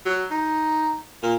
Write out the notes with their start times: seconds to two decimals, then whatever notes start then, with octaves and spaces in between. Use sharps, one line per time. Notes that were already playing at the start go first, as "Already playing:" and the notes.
0.06 F#3
0.31 D#4
1.23 A#2